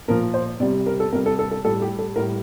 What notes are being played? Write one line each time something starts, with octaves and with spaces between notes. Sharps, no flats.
A#2 F3 A#4
C5
C3 G3 D5
A#4
A4
C3 G3 A#4
A4
A4
A4
A2 G3 A4
G4
A4
A2 G3 A#4